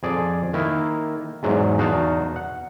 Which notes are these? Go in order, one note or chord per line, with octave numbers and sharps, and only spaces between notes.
F2 G#4 D5
D#3 A#3 E4
E2 G#2 F#3
E2 D#4 F#4 F5 F#5 A5
F#5